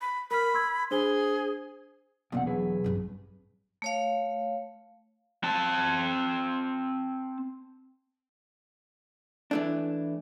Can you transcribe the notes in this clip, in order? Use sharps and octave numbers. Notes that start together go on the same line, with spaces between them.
B5
A#4 B5 F6
C6 E6 G#6
D4 G#4 C5 G7
E1 A#2 E3 F#5
F#3 G#4 B4
A1 G2
A3 C#5 F5
C4 A5
E3 A3 D4